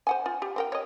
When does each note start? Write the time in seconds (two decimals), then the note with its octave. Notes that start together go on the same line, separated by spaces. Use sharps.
0.07 C5 F#5 G#5
0.26 F4
0.42 G4
0.56 C4 A#4 G5
0.72 C#5 D#5